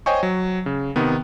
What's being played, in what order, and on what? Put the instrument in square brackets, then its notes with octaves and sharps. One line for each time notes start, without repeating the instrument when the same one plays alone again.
[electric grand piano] C5 C#5 D#5 G5 G#5 C#6
F#3
C#3
C3 D#3 B3